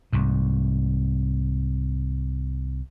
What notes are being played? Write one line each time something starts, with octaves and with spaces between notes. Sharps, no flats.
C2 G#2